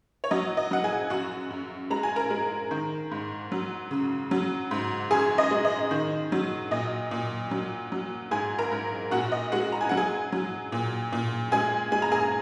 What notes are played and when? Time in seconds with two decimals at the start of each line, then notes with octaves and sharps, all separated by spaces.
0.24 C#5
0.31 F#3 D#5
0.57 D#5
0.71 F#3 F#5
0.84 G#4 G#5
1.10 F#2 F#4 F#5
1.51 F#2
1.90 G#3 A#5
2.03 G#5
2.16 A#4 A#5
2.30 G#3
2.71 D#3
3.11 G#2
3.52 F#3
3.91 C#3
4.31 F#3
4.71 G#2
5.11 F#2 G#4 G#5
5.38 D#5
5.51 G#3
5.65 D#5
5.91 D#3
6.32 F#3
6.71 A#2 D#5
7.11 A#2
7.51 F#3
7.92 F#3
8.31 G#2 G#4 G#5
8.59 A#4 A#5
8.72 G#2
9.11 A#2 F#4 F#5
9.32 D#5
9.52 G#3 F#4 F#5
9.72 A#5
9.81 G#5
9.89 F#3 F#5
9.97 G#4 G#5
10.32 F#3
10.72 A#2
11.12 A#2
11.52 G#3 G#4 G#5
11.92 G#3 G#5
12.02 A#5
12.12 G#4 G#5